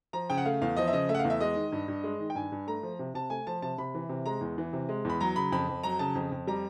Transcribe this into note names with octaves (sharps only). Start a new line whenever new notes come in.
F3 A#5
C#3 G5
F#5
A3 F5
E2 F5
F3 D#5
E5
C#3 D#5
A3 E5
F#5
F5
E2
E5
G#3 D#5
D#3
G2
G2
G#3
D#3
G5
G2 G#5
G2
A3 A#5
F3
C3
C3 A5
A3 G#5
F3 A5
C3 A5
C3 B5
E3
C3
G#3 A#5
E2
E3
C3
G#3
E2 B5
F#3 A#5
C#3 B5
F2 B5
F2
F#3 A#5
C#3 A5
F2
F2
G3 A#5